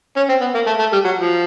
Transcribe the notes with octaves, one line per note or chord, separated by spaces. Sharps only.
C#4
C4
B3
A#3
A3
A3
G3
F#3
F3